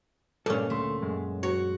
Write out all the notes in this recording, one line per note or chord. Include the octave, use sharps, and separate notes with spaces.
G2 A#2 G#3 C#4 A4
D2 A3 C6
F#2 G#3
F#4 C#5